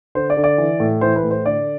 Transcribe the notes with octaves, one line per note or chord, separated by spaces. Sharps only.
D3 C5
D5
D3
D5
E3
A2
E3 C5
B4
A2
C5
D3 D5